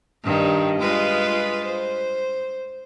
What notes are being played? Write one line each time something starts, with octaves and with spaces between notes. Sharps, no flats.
G2 D#3
G#3 F4 B4
C5